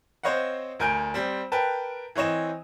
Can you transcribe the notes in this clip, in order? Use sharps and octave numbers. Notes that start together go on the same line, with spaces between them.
C4 C5 C#5 D#5 F5 F#5
D2 A#4 G#5 G6 D7
G3 C4
A#4 B4 G5 A5
E3 C4 C#5 D#5 E7